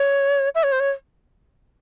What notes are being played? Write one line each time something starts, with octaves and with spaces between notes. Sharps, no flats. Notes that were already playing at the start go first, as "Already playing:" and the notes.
Already playing: C#5
E5
C#5
C5
C#5